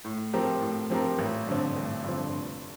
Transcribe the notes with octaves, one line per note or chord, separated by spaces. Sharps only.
A2
F3 C4 G4 A#4
A2
F3 C4 G4 A#4
A1
G2 D3 F3 C4
A1
G2 D3 F3 C4
F1